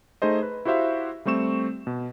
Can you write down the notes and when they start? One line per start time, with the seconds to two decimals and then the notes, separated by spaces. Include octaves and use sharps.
0.22 A3 D#4 G#4 C5 D#5
0.43 B4
0.65 E4 F#4 G4 C5 E5 F5
1.25 G3 A3 C4 C#6 E7
1.87 B2